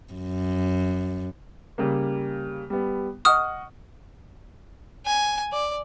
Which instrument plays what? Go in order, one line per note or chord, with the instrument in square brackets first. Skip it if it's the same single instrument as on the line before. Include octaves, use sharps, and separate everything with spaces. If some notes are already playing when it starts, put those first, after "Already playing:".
[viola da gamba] F#2
[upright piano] C#3 G3 A#3
G3 B3
[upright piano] D#5 F#5 C#6 [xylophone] D#6 F6
[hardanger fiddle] G#5
D5